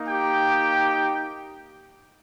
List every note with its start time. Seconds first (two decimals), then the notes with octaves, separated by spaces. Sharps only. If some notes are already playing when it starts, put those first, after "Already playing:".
Already playing: A#3 D#4
0.08 G4 G5